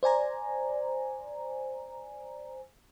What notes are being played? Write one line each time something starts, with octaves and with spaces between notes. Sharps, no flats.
C5 D5 G#5 A#5